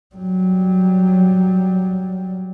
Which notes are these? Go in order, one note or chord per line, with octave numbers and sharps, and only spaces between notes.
F#3 G3